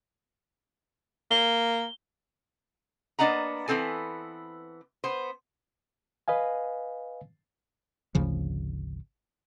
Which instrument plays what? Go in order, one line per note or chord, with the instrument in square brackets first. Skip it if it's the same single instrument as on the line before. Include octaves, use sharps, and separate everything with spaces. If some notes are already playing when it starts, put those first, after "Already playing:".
[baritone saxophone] A#3 [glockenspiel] G7
[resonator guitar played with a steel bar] A#3 B3 D4 D#5 F#5 A#5
E3 B3 C4 A4 G#5
B3 C5
[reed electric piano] B4 D#5 F5 G#5
[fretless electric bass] G#1 D2 C#3 F3